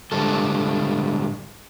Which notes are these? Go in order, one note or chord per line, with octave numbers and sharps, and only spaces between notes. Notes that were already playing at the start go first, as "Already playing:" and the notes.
G#2 D3 G3 A4